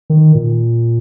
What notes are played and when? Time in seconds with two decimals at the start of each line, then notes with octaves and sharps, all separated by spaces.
0.10 D#3
0.35 A#2